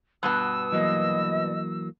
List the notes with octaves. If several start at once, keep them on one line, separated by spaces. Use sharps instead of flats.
G2 B2 B3 E6
E3 F#3 A#3 D#5